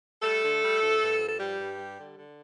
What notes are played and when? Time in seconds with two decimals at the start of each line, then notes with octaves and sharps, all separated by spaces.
0.22 G3 A3 A4
0.42 D3
0.61 G3
0.80 D2
1.00 G2
1.19 F3
1.27 A4
1.38 G2 G3 G4
1.58 G2
1.77 G3
1.96 D3
2.15 D3